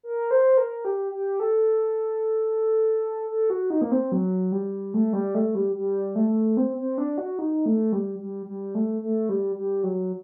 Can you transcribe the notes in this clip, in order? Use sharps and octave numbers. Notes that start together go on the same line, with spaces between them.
A#4
C5
A#4
G4
G4
A4
A4
F#4
D#4
A#3
C4
F#3
G3
A3
G3
A3
G3
G3
A3
C4
C4
D4
F#4
D#4
A3
G3
G3
G3
A3
A3
G3
G3
F#3